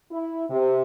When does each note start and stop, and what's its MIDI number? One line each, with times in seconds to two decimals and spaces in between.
0.11 0.43 64
0.50 0.82 48